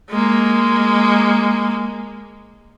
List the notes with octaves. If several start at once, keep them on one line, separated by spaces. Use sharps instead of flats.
G#3 A#3